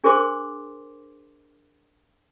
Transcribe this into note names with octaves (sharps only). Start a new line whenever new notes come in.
D4 G#4 A#4 C5 C6 D6